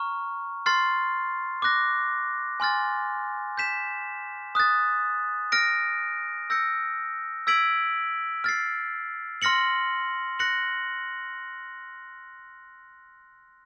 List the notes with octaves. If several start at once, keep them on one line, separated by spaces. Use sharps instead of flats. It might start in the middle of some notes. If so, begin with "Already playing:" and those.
Already playing: A#5 C#6 F6
C6 F6 A6 C7
D6 F#6 A#6
G#5 C6 F6 A6
G6 B6 E7
D#6 F#6 A6
F6 A#6 D7
E6 G6 A#6 C#7
E6 G#6 B6 D7 F#7
F6 A6 C7
C6 F6 A#6 C#7 F#7
F#6 A#6 C#7 F#7